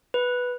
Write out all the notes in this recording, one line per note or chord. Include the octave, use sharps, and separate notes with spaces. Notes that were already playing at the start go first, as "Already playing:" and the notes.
B4